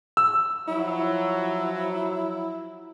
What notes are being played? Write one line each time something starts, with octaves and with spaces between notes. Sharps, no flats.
E6
F3 F#3 E4